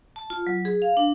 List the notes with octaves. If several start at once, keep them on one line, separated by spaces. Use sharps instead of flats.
A5
F4
F#3
G#4
F5
D4